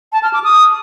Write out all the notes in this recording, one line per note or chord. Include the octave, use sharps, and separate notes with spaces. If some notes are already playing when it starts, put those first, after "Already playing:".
A5
F6
D6
D#6